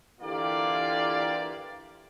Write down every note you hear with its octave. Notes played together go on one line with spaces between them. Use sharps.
D3 E3 A#3 F4 G4 D5